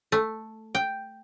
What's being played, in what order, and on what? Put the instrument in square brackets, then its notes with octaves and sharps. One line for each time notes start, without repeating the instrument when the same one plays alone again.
[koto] A3
G5